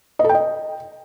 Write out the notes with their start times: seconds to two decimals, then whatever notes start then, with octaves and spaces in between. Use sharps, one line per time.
0.19 D#5
0.24 A4
0.29 G5
0.34 D#5